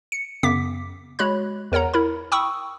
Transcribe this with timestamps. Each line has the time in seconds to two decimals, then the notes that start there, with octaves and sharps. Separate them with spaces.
0.12 C#7
0.43 F#2 C#3 B3 D6 B6
1.19 G#3 F#4 C#5 B5 F#6
1.72 E2 A#4 C#5 F#5 A#5
1.94 E4 A#4 B5
2.32 G5 B5 C#6 D#6 E6